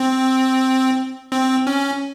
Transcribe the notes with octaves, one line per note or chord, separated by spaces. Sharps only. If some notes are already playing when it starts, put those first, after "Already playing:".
Already playing: C4
C4
C#4